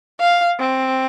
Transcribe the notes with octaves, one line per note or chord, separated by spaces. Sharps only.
F5
C4